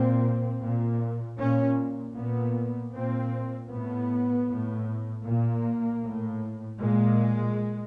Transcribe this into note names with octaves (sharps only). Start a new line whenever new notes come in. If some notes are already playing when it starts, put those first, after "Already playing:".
Already playing: A#2 C4
A#2
A#2 C#4
A#2 B3
A#2 C4
A2 B3
A2
A#2 A#3
A2
A#2 G#3